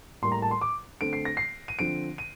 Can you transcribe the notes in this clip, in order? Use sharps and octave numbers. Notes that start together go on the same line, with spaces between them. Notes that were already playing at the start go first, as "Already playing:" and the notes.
A2 G3 A#3 C6
A#5
A5
C6
D6
D3 A3 C4 D7
C7
A#6
C7
D#7
D3 F3 C4 D7
D#7